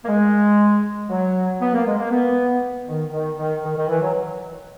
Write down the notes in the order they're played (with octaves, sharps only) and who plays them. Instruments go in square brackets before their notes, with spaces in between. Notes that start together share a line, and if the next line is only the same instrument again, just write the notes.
[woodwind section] A#3
G#3
F#3
B3
A#3
G#3
A#3
B3
D#3
D#3
D#3
D#3
D#3
E3
F#3